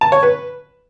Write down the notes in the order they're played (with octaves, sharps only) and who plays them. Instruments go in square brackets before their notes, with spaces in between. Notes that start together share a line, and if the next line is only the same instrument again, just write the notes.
[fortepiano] A5
C#5
B4